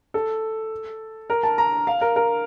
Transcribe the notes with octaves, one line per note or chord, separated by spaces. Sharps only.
A4
A#4
A5
A#5
F5
A#4
A#4